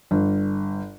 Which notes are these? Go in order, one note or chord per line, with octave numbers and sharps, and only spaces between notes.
G1